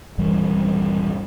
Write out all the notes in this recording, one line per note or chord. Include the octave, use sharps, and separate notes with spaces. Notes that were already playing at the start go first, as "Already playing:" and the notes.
D#1 G2 E3 G3